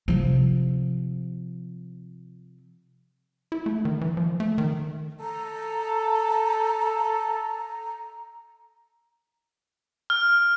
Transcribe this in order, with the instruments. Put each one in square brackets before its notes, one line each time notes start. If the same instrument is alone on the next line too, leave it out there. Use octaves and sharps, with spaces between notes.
[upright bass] C3 F3
[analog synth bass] E4
A3
D#3
E3
F3
A3
D#3
[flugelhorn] A4 [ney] A#5
[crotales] F6